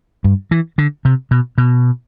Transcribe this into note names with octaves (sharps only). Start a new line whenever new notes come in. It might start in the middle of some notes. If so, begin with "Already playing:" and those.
G2
E3
D3
C3
B2
B2